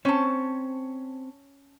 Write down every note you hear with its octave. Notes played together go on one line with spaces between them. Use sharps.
C4 C#4 C5 C#5 A5